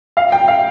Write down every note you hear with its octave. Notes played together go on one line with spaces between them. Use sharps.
F5
G5
F5